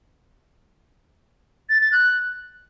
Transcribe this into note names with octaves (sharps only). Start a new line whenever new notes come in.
A6
A6
F#6